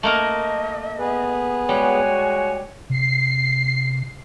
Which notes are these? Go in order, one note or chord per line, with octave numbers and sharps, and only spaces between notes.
A3 A#3 A#4 D#5
B3 G#4 B4
G3 G#3 F#4 C#5 G#5
C3 C7